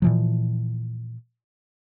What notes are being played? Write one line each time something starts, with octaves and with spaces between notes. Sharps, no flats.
A#2 E3 F3